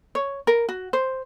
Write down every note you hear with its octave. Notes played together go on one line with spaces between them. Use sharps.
C#5
A#4
F#4
C5